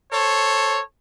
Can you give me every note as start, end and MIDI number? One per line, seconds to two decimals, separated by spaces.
0.12 0.80 69
0.12 0.80 72
0.12 0.80 73